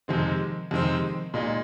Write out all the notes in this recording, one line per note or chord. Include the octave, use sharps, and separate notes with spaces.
F2 C3 D#3 G#3 C4
F2 C3 D#3 G#3 C4
A#2 G#3 D#4